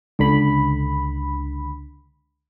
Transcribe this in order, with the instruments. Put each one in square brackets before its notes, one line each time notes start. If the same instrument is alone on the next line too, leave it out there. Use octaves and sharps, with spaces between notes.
[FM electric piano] C#2 D3 B5